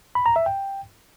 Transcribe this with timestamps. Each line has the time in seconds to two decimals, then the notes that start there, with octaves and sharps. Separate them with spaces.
0.15 B5
0.26 A#5
0.36 E5
0.46 G5